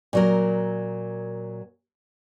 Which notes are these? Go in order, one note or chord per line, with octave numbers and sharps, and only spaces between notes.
A#2 F#3 A#4